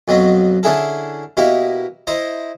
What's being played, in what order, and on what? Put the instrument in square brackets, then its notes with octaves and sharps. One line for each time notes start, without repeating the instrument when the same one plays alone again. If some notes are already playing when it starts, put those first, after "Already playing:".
[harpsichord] F2 B2 F#3 B3
D3 C#4 D4 E4 G#4 A4
B2 A#3 E4 G4
E4 C5 D#5 A#5